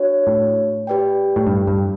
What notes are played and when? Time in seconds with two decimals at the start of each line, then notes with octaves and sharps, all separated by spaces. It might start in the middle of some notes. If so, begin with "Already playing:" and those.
Already playing: D4 F#4 C#5
0.27 A2
0.87 G4 B4 D5 G5
1.36 A2
1.47 G2
1.67 G2